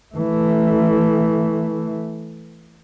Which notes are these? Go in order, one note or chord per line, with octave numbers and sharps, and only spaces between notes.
E3 A3